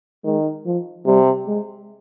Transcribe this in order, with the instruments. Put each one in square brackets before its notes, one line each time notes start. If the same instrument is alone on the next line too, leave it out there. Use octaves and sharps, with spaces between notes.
[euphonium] D#3 [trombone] G#3
[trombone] F3
[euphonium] C3 [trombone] G3
[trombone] G#3